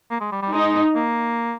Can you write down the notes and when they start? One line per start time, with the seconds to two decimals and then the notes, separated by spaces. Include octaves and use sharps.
0.10 A#3
0.20 G#3
0.32 G3
0.42 G3
0.53 G#3 D#4
0.95 A#3